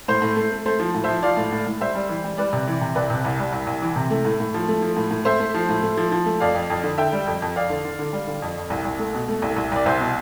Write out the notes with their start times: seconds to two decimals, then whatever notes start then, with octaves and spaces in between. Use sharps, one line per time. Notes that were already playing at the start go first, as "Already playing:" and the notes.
0.08 A2 C5
0.22 A2
0.36 A3
0.52 A3
0.66 A3 C5
0.80 F3
0.95 A2
1.04 F3 C5 E5
1.23 F3 D5 F5
1.37 A2
1.52 A2
1.66 A2
1.80 G3 C5 E5
1.95 G3
2.09 E3
2.24 G3
2.38 G3 B4 D5
2.53 C3
2.67 E3
2.81 C3
2.95 C2 B4 D5
3.10 C3
3.25 C2
3.39 G3
3.53 C2
3.67 C2
3.82 E3
3.96 C3
4.10 A3
4.25 A2
4.40 A2
4.54 F3
4.68 A3
4.82 F3
4.97 A2
5.11 A2
5.25 A3 C5 E5
5.40 A3
5.54 F3
5.69 A2
5.83 A3
5.97 F3
6.12 F3
6.26 A3
6.40 F2 D5 F5
6.55 F2
6.70 F2
6.83 D3
6.98 D3 E5 G5
7.12 G3
7.27 F2
7.42 F2
7.56 F2 D5 F5
7.70 D3
7.85 D3
7.99 D3
8.13 G3
8.27 D3
8.42 F2
8.57 F2
8.70 C2
8.85 C2
8.99 A3
9.15 B2
9.28 A3
9.42 C2
9.56 C2
9.72 C2 D5
9.86 C2 C5 E5
10.00 B2